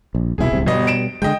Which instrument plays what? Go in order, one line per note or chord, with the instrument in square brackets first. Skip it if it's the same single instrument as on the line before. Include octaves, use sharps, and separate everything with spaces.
[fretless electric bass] A#1
[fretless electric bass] E1 C2 B2 [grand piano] E4 G#4
[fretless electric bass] D1 C2 C3
[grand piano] G1 D#5 [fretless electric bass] B2 G3
[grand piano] D7 E7
[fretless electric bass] D3 F3 G#3 [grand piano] D#5 G5